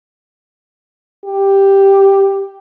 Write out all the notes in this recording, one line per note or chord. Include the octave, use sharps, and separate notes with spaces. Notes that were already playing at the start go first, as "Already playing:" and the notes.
G4